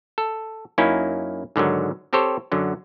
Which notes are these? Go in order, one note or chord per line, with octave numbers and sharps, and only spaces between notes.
A4
F#2 A#3 C#4 D#4 E4
G#2 D3 D#3 F#3
C4 G4 A4 C5 C#5
F#2 D3 F#3